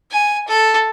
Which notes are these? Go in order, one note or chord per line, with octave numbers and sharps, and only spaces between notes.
G#5
A4